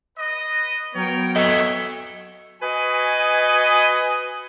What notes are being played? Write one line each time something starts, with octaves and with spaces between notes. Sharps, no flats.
B4 D#5
F#3 B3 A#4 C#5 G5
A4 C#5 D#5 E5 C#6
F#4 B4 D#5 G#5